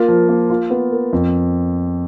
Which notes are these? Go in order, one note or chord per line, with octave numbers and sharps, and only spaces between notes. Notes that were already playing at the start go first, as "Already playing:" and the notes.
Already playing: A#3 F4
F3
A#3
F4
B3
A#4
F2